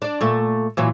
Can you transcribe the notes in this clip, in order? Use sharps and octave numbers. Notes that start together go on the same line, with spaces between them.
D4 D5
A#2 A3
A#2 E3 F#3